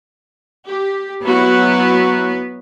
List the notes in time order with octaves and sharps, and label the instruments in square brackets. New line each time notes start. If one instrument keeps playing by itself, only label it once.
[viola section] G4
[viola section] F#3 E4 F#4 [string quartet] B3